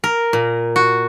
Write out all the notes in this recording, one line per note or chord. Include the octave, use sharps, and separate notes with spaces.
A#4
A#2
F#4